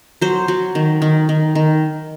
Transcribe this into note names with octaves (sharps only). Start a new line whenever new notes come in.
F#3 C5
F#3
D#3
D#3
D#3
D#3